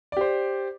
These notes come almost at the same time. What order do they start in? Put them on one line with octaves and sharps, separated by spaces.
D5 G4 C5